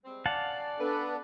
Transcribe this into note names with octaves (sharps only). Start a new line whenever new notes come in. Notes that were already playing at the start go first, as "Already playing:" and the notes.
G3 G#3 C4
C#4 G4 D5 F5 F#5 A5
B3 D4 A4 B4